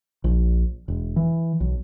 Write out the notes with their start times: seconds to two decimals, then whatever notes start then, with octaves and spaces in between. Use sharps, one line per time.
0.24 A#1
0.88 E1
1.16 E3
1.60 B1